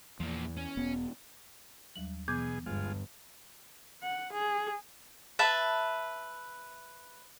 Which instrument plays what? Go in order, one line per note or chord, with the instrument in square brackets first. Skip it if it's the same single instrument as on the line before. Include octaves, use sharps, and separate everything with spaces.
[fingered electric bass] E2 [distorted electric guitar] F3 A#3
[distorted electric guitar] C#4
[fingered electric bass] E1 B3
[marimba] D#2 F#3 G3 [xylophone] F#7
[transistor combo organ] B2 G#4 [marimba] E3 B3 [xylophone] D6 G6 G#6
[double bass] G1 G2 [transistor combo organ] G#3 F4
[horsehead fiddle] F#5
G#4
[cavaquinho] B4 E5 A5